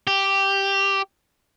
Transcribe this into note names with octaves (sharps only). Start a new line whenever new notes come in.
G4